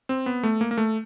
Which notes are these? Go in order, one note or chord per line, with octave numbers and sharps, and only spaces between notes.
C4
B3
A3
A#3
A#3
A3